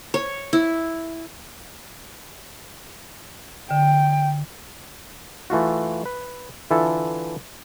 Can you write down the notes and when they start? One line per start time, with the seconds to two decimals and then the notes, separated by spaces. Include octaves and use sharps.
0.14 C#5
0.53 E4
3.71 D3 G5
5.50 E3 A3 F4 F#4
6.06 B4
6.70 D3 E3 E4 F4 A4